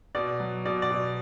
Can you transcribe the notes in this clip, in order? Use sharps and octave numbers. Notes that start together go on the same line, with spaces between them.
B2 D5
F#3
B2 D5
D5
B2